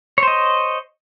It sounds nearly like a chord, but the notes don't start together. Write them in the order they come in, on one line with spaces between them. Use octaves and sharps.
C#5 C5 D#5